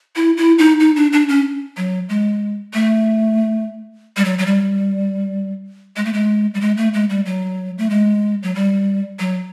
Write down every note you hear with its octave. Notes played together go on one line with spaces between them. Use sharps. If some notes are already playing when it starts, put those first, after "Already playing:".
E4
E4
D#4
D#4
D4
D4
C#4
F#3
G#3
A3
G3
F#3
F#3
G3
G#3
A3
G#3
G3
G#3
A3
G#3
G3
F#3
A3
G#3
F#3
G3
F#3